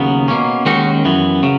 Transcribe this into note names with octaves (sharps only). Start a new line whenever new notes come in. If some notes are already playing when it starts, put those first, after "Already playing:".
Already playing: D#2 C#3 F#3 B3
B2 A#3 C#4
D#2 D#3 G#3 C#4 D#4 F#4
F#2 E3 B3
C#3 F#3